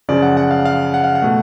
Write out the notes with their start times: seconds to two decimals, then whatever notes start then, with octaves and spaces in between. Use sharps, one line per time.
0.09 F#2 C#3 F3 D5
0.22 F#5
0.37 F#5
0.51 F5
0.65 F5
0.94 F#5
1.04 F5
1.15 F#5
1.22 B2 A3